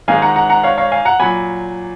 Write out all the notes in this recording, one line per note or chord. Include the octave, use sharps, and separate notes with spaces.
G#2 D#3 G#3 F5 G#5
F#5 A#5
F#5 A#5
F#5 A#5
C#5 F5
C#5 F5
F5 G#5
F#5 A#5
A#2 F#3 G#5 B5